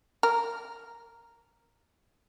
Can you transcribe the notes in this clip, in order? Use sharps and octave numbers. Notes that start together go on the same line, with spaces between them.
A#4